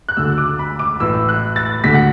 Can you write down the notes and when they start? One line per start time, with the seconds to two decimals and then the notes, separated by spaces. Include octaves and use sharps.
0.09 F#6
0.17 D2 D3 E6
0.38 D6
0.59 B5
0.79 D6
1.00 A1 A2 E3 E6
1.29 F#6
1.56 A6
1.84 D2 D3 B6
1.94 F#5